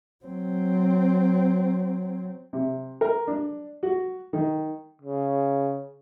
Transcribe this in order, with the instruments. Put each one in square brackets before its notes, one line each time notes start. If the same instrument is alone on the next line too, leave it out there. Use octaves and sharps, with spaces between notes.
[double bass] F#3 C4
[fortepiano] C3
A#4
D4
F#4
D#3
[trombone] C#3